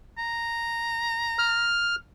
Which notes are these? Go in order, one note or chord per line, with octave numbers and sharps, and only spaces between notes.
A#5
F6